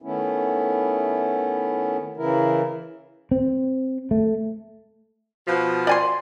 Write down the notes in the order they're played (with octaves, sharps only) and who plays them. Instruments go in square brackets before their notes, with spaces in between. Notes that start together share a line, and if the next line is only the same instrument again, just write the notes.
[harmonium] D#3 A3 B3 C#4 E4
C#3 E3 E4 A#4
[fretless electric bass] C4
A3
[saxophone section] B2 F3
[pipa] D5 G#5 C6